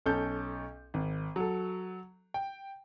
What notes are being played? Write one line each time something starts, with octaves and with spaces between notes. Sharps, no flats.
B1 C#4 A4 G6
G#1
F#3 A4
G5